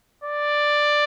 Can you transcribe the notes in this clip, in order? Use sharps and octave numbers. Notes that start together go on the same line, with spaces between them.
D5